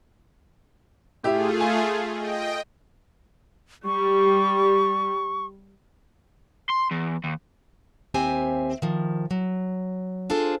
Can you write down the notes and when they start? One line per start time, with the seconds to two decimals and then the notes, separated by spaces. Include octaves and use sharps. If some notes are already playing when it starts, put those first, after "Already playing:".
1.23 A2 A3 F4 G4 G#4 E5
1.60 G#5
2.13 D#5 G5
3.85 G3 C#6
6.69 C6
6.91 E2
7.24 D#2
8.14 D#2 C4 G4 C5 E5 G#5
8.82 D#3 F3
9.31 F#3
10.30 D4 F4 G#4 A4 C5